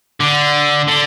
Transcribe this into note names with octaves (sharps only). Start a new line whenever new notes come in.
D3
D3